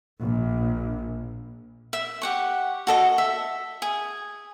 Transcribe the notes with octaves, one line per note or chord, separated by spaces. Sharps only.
A#1
E5
G4 F#5 C#6
F#4 A4 D#5
E5
G#4